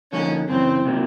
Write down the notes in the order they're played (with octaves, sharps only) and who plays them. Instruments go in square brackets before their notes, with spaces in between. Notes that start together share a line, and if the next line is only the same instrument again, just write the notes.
[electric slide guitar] D3 F3 A#3 D#4 [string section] C#4
[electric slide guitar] F#2 C#3 E3 [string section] C4
[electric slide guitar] C3 D#3 F#3 A#3